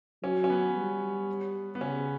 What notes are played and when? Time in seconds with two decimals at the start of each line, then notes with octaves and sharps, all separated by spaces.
0.23 F#3 C#4
0.44 C#4
0.50 B3
0.76 G3
1.75 B3
1.81 C#3 C#4